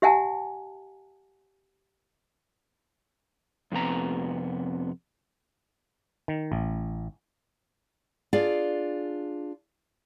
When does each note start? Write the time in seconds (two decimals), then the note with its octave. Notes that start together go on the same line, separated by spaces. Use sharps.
0.02 G4 E5 F#5 G#5 A5
3.72 F2 C3 B3 A#5
6.28 D#3
6.52 A1
8.33 D4 F4 G#4 D5 F5